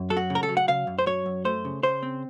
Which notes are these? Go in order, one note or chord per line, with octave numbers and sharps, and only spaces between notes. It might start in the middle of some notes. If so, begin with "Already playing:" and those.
Already playing: F#2
F#3 A4
F#4
C#3
A#4
A4
F#3
F#5
C#3 F5
F#2
C5
F#3 C#5
F#2
A3 C5
C#3
C#3 C5
C4